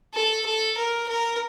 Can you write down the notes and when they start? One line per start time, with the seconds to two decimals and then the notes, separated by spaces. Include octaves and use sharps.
0.14 A4
0.46 A4
0.77 A#4
1.09 A#4